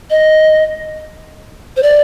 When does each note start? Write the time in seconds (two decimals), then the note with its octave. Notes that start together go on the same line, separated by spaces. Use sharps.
0.10 D#5
1.77 C5
1.83 D5